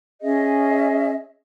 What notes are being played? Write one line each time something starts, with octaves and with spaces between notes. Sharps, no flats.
C#4 G#4 D#5 E5